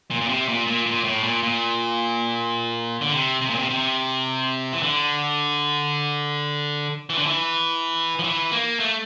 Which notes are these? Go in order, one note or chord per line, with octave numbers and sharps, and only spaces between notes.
A#2
A#2
C3
A#2
A#2
A#2
A2
A#2
A#2
D3
C3
C3
A#2
C3
C3
E3
D3
E3
D3
E3
F3
E3
A#3
A3